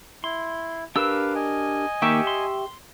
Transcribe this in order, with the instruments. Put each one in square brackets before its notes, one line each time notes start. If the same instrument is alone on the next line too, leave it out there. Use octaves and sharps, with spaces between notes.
[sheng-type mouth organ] E4 [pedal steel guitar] C6
[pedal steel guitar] D4 G4 A#4 [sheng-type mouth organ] B4 F5 [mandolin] E6
[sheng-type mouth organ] D#5 G#5
[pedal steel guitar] D#3 A#3 [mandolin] G4 E5 C#6
[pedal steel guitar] C6